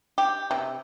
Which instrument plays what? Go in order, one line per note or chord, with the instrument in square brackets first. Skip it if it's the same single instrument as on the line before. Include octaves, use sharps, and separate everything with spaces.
[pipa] G4
C3